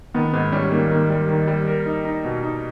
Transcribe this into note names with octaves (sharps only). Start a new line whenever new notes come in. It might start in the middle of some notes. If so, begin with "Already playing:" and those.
D#3 B3
G#2 B3
G3 C#4
D#3 A#3
D#3 A#3
G3
D#3
G3
A#4
D#4
D#4
B2
D#4